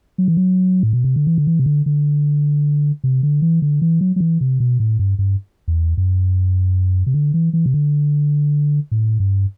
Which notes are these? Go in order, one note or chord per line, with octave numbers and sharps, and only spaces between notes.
F#3
E3
F#3
A2
B2
C3
D3
E3
D3
E3
C3
D3
D3
C3
D3
E3
D3
E3
F#3
F#3
E3
C3
B2
A2
G2
G2
E2
F#2
C3
D3
E3
E3
C3
D3
A2
G2